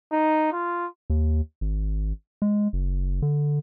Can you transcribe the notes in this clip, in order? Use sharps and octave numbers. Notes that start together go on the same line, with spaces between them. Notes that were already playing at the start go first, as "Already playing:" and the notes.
D#4
F4
D#2
G#1
G#3
F#1
D3